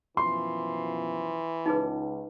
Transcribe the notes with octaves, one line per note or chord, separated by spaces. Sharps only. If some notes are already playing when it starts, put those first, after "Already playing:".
F#2 B2 E3 F3 C6
C#2 D#4 G#4 B4